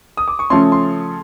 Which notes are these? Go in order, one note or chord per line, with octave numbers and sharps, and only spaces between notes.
D#6
D6
C#6
C#3 F3 A3 C#4 C6
C6